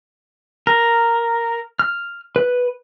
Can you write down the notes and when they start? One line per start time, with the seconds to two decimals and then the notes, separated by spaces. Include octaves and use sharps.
0.67 A#4
1.79 F6
2.36 B4